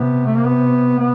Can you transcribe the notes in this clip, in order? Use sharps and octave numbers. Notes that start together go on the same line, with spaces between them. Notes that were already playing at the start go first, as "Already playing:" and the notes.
Already playing: C3 B3
A3
A#3
B3
B3